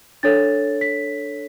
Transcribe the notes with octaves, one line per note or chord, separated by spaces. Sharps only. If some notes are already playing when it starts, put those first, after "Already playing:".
D4 A4 C#5 A6
B6